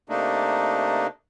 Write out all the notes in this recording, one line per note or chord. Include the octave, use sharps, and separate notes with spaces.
C3 A3 A#3 D4 D#4